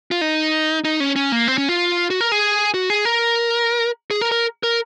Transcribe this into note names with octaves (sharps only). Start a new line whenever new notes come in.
F4
D#4
D#4
C#4
C#4
A#3
C4
C#4
F4
F#4
A#4
G#4
F#4
G#4
A#4
G#4
A#4
A#4
A#4